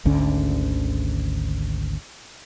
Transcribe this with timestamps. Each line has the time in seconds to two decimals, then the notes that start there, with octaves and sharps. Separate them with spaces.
0.05 G#1 D2 D3 C#4